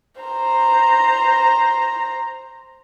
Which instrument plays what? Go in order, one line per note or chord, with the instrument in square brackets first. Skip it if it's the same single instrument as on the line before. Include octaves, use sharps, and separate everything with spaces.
[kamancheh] C5 A#5